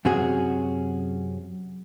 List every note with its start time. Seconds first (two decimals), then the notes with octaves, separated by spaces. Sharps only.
0.05 F#2 C3 C#4 F#4 G#4